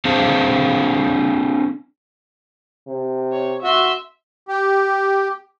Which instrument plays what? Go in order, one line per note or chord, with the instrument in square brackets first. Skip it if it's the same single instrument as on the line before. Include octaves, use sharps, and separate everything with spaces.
[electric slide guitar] C4 D4 G#4 C5 F5 A5
[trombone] C3
[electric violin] C#5
[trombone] F#4 [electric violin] E5 C6
[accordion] G4